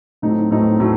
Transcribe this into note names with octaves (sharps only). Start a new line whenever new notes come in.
A2 F#3 A3 C4 D#4
A2 F#3 A3 C4 D#4
A2 F#3 A3